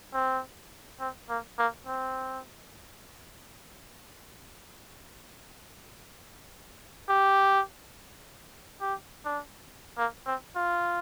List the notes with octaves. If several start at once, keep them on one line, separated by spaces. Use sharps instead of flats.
C4
C4
A#3
A#3
C4
G4
G4
D4
A#3
C4
F4